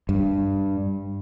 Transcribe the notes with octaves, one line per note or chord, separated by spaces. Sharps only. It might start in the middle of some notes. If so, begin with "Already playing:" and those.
G2